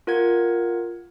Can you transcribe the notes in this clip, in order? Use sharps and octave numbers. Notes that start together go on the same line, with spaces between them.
F4 A#4 F#5 G#6